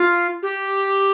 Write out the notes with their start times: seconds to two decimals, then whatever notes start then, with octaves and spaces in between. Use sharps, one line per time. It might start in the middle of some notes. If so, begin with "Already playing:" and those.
Already playing: F4
0.43 G4